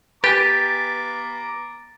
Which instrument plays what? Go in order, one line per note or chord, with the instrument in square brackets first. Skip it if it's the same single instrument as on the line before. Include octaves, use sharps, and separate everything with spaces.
[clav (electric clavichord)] G4 [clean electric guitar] B4 G#5 [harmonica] A#5 D6 [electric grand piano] A6